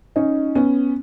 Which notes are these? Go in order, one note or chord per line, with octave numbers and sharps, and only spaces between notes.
C#4 D#4
B3 C#4